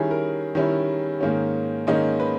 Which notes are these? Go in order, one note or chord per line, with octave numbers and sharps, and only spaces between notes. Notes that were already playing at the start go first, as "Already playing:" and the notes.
Already playing: D#3 G3 C#4 E4 G#4
A#4
D#3 G3 C#4 E4
G#2 D#3 A#3 C#4
G#2 D#3 A#3 C#4 D#5
B4